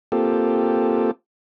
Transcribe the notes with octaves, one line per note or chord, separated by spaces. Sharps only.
A#3 C4 F4 G4 A4